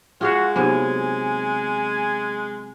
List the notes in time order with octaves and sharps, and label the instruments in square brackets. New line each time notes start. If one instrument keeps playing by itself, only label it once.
[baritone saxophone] G#3 [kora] F4 G#4 F5 [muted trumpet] F#4
[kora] C3 F#3 A#3 [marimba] B3 D#4 [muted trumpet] G#5